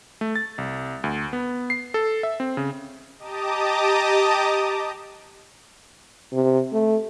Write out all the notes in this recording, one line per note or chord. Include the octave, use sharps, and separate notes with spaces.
A3
A6
C2
D2
B3
C7
A4
E5
C4
C#3
G4 D#5 A5 A#5 D6 D#6
C3
A3